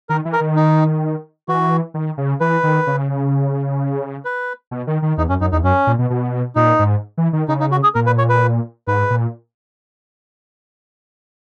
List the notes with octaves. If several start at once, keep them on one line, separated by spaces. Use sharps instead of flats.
D#3 A#4
E3
A#4
D#3
D#4
E3 F#4
D#3
C#3
E3 B4
D#3
C#3
B4
B2
D#3
D#3
E2 D#4
F#2 C#4
F#2 D#4
E2 D#4
F#2 C#4
A#2
B2
B2
A#2 D#4
G#2
E3
D#3
C#3 D#4
D#4
F#4
G#4
A#2 A#4
B4
C#5
B4
G#2 B4
A#2